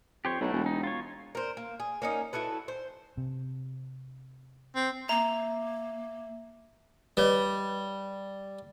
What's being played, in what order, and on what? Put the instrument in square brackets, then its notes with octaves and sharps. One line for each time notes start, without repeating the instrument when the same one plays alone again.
[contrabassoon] F2 [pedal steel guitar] G4 C5 C#5
[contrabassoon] B1 [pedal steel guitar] A3 E4 F#4
[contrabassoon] E1
[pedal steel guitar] D#4
F4 C#5
[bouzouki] A#4 C5
A#3
G#4
A#3 C#4 D#4
E4 F#4 A4 B4
C5
[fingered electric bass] C3
[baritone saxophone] C4
[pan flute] A#3 [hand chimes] E5 [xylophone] A#5
[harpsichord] G3 [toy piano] B4 C#5 D#5